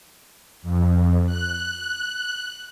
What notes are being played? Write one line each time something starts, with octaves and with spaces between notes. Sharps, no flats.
F2
F#6